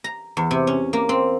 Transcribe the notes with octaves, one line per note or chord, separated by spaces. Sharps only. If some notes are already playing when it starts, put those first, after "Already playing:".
A#5
E2
C3
C#4
A#3
C4